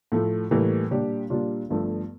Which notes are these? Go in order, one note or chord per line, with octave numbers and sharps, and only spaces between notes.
A2 F3 A3
A2 E3 G3 A#3
A#2 G3 D4 G4
A#2 G3 D4 F4
G1 G2 F3 A3